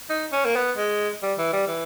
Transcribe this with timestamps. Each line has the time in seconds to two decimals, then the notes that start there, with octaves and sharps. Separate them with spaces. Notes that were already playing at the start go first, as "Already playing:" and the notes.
0.10 D#4
0.32 C#4
0.45 A#3
0.55 B3
0.77 G#3
1.23 G3
1.38 E3
1.53 G3
1.67 E3